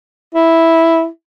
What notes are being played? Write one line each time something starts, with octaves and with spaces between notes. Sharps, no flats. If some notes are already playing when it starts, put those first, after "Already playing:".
E4